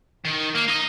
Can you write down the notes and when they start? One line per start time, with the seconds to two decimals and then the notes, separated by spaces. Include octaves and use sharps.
0.25 D#3
0.55 A#3
0.68 D#4 D#5